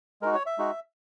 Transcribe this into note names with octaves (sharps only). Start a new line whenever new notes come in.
G#3 D#4 F#4 A#4
C#5
E5
G#3 D#4 F#4